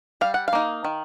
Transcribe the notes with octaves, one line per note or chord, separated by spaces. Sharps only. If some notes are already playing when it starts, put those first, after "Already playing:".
G3 F5
F#5
F5
A#3 D#4
D#3